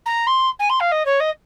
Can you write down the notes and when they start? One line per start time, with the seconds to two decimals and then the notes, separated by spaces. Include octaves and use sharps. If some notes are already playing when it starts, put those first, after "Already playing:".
0.05 A#5
0.26 C6
0.59 G#5
0.69 C6
0.80 F5
0.91 D#5
1.05 C#5
1.20 D#5